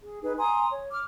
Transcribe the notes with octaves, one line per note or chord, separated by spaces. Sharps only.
G#4
D#4 G#4 B4
G#5 A#5 C6 D#6
C#5
D6 F6